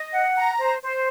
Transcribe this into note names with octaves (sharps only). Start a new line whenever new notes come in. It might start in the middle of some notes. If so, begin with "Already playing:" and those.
Already playing: D#5
F#5
A#5
C5
C5